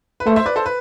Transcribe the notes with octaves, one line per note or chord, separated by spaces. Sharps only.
B4
A3 A4 C5
C5 E5
B4 D5
A4 C5
B4